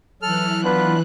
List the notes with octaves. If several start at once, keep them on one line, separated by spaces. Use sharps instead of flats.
E3 F#3 A4 F6 F#6
B3 D4 F4 B4